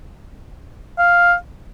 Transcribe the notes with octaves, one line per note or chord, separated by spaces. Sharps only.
F5